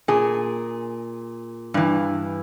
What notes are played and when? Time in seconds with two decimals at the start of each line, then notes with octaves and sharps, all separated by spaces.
0.08 A#2 G#4
1.74 G2 E3